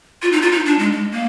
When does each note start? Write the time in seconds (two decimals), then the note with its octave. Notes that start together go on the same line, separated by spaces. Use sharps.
0.22 F4
0.32 D#4
0.42 F4
0.52 D#4
0.66 D4
0.79 G#3
0.92 G#3
1.12 A#3